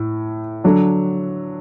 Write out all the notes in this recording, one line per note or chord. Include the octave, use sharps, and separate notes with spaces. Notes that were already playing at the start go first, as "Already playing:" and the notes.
Already playing: A2
D3 F#3 D4 A4